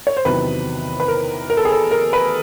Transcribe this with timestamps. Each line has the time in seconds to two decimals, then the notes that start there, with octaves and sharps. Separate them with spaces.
0.07 C#5
0.17 C5
0.25 E2 C3 D#3 F#3 B4
1.00 B4
1.08 A#4
1.50 A#4
1.57 A4
1.65 G#4
1.72 A4
1.91 A#4
2.13 B4